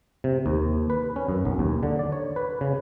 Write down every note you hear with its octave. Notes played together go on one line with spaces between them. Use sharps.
C3
D#2
B4
C#4
F#2
B1
D#2
D3
D5
C#5
B4
C#3